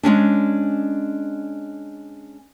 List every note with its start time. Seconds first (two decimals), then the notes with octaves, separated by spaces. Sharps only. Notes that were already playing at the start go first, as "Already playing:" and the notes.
0.03 G#3 A#3 C#4 D4